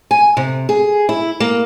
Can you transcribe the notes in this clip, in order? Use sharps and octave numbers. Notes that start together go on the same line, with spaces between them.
G#5
C3
G#4
E4
A#3